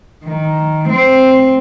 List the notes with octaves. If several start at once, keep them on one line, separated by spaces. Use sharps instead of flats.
D#3
C4